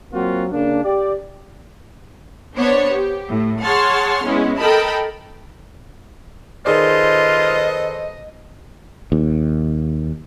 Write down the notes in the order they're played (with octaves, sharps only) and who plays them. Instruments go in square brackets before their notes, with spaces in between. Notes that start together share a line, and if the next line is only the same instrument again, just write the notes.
[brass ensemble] F#3 A#3 C4 F4 F#4
C#3 A#3 D4
G4 D5
[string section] B3 D4 C5 C#5
G4
A2
G#4 C#5 F#5 A5 C6 F6
G#3 B3 C#4 E4
A4 A#4 D#5 G5 A5 B5
[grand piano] D#3 G#4 D5 [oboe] F4 [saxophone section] A4 B4 C5 [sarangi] D#5
[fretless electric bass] D#2